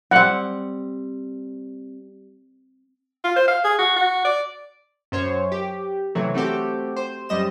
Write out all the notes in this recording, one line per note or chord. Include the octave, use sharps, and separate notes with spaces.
G3 C4 F#5
F4
C5
F5
G#4
F#4
F#4
D5
F#2 C5 C#5
G4
C3 E3 F#3 A3
A3 C4 F#4 G4 A4
C5
F#2 G3 D#5 E7